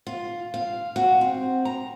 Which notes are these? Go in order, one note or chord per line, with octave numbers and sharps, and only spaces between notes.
F4
F5
F#4
C4
A#5